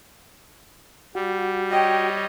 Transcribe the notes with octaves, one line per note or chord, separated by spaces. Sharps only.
G3 F#4
C#5 D#5 G5